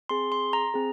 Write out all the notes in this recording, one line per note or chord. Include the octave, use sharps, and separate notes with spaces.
C4 G#4 C6
C6
A#5
C4 G#4